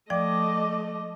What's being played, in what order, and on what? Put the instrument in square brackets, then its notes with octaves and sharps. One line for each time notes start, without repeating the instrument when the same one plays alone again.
[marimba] F3 D5 G5 [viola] A3 D#5 [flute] D6